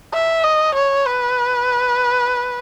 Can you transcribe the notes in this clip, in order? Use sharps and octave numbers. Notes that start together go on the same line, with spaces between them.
E5
D#5
C#5
B4